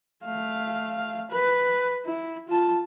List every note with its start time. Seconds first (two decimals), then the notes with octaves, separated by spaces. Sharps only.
0.25 A3 F5
1.30 B4
2.06 E4
2.48 F4 A5